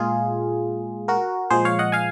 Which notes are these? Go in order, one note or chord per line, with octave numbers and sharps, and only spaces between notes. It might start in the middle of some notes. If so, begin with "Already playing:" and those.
Already playing: A#2 G#3 F4 G#4
F#4 A#4
A#2 F3 G#3 G#4 C5
C#5 F5
D#5 F#5
F5 G#5